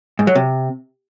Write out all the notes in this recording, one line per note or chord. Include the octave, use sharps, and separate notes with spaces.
G#2
F#3
C3